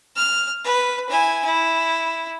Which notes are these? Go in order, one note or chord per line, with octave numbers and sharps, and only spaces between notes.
F6
B4
E4 G#5
E4